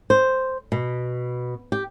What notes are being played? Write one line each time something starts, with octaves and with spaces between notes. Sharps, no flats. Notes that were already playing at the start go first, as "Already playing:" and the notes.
C5
B2
G4